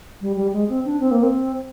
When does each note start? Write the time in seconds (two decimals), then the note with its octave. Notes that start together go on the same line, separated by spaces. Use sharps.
0.21 G3
0.36 G3
0.53 G#3
0.69 C4
0.85 D4
1.00 C4
1.11 A#3
1.23 C4